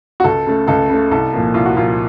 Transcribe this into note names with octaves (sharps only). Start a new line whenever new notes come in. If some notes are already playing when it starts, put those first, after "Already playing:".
F#4
C#2 A4
C#3 A3
C#2 A4
C#3 A3
C2 A4
A#2 F3 A#3
C2 F4
F#4
A#2 F3 A#3 F4